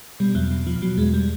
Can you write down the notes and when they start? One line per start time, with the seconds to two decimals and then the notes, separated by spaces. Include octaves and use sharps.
0.20 B2 G3
0.35 E2 F#3
0.51 B2
0.67 B2 F3
0.82 B2 F#3
0.98 E2 G#3
1.14 G3